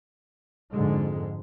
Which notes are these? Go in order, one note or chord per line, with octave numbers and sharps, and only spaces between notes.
F2 G#2 D3 G#3